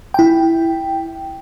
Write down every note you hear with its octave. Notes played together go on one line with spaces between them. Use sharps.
E4 G5